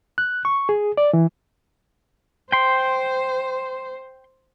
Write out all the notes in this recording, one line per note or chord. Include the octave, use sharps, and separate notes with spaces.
F#6
C#6
G#4
D5
E3
C5 G5 C6